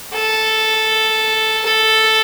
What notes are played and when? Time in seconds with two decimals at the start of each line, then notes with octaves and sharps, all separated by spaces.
0.15 A4
1.66 A4